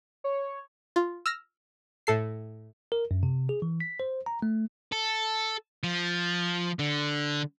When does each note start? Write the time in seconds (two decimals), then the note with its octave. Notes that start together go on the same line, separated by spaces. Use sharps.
0.24 C#5
0.96 F4
1.26 E6 F6 A#6
2.07 A2 A4 C7
2.92 A#4
3.11 F#2
3.23 C3
3.49 G#4
3.62 E3
3.80 B6
4.00 C5
4.26 A#5
4.42 A3
4.92 A4
5.84 F3
6.79 D3